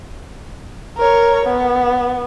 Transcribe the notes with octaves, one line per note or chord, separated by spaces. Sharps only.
A#4 C#5
B3